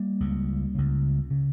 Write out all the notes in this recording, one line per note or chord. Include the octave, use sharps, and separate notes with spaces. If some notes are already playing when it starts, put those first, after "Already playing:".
Already playing: G3 A#3
C#2 C#3
C#2 C#3
C#3